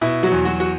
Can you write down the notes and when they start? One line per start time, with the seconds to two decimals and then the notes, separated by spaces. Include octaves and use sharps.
0.01 B2 E4
0.23 F#3 F#4
0.31 E2
0.45 F#3 F#4
0.60 F#4